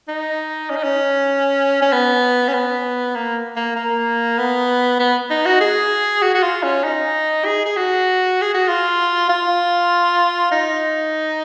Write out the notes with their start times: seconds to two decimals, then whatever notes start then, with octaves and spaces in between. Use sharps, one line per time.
0.08 D#4
0.70 C#4
0.76 D#4
0.84 C#4
1.82 C#4
1.92 B3
2.48 C#4
2.54 B3
3.15 A#3
3.56 A#3
3.76 A#3
4.38 B3
4.99 B3
5.30 D#4
5.46 F#4
5.61 G#4
6.22 F#4
6.35 F#4
6.43 F4
6.63 C#4
6.84 D#4
7.45 G#4
7.65 G#4
7.76 F#4
8.42 G#4
8.54 F#4
8.68 F4
9.29 F4
10.52 D#4